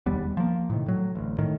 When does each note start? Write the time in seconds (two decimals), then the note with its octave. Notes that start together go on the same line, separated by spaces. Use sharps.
0.06 E1 D#2 G3 B3
0.37 F3 A#3
0.70 A2 C3 D#3
0.86 A2 F#3
1.15 A1 D2
1.38 A2 D#3